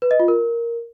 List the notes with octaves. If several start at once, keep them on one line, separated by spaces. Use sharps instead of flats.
B4
D#5
F4
A#4